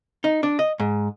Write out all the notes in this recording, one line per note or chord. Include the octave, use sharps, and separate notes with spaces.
D#4
D4
D#5
G#2